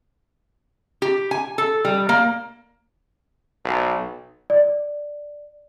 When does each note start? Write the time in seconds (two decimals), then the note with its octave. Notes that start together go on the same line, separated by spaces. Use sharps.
1.02 G4
1.31 G#5
1.58 A4
1.85 G3
2.09 A#3
3.65 B1
4.50 D5